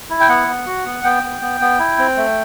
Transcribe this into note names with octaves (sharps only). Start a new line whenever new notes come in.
E4
G5
B3 F#5
B3
F#4
B3
B3 G5
B3
B3
B3
E4
C4
A3